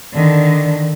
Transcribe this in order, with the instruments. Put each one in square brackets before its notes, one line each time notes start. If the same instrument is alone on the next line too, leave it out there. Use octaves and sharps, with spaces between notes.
[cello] D3 D#3